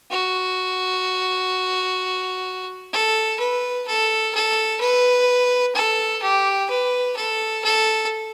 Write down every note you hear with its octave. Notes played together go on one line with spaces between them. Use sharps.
F#4
A4
B4
A4
A4
B4
A4
G4
B4
A4
A4